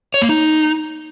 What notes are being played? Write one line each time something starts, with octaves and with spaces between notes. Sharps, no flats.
C#5
A#3
D#4